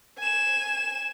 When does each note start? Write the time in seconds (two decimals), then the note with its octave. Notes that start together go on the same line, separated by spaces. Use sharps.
0.18 G#5 E7